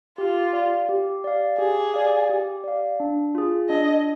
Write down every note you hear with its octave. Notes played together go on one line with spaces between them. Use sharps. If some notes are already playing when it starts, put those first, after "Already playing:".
F4 G4
D5 F5
G4
D5 F5
G4 G#4
D5 F5
G4
D5 F5
D4
F4 G#4
D4 D#5